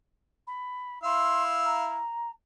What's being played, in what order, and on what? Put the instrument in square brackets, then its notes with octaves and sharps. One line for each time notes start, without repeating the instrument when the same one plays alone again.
[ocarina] B5
[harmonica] E4 F5 E6 [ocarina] C6
[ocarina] A#5